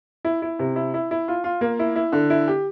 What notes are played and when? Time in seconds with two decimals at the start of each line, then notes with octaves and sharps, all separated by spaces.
0.25 E4
0.42 E4
0.59 C3
0.76 E4
0.94 E4
1.11 E4
1.28 F4
1.44 F4
1.61 A#3
1.79 E4
1.96 E4
2.12 D3
2.30 E4
2.48 G4